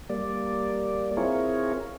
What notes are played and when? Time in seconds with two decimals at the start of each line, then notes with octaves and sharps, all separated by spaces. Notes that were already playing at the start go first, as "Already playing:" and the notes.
0.10 G3 A#3 D5
1.17 C4 E4 F4 G#4 A#4 C#5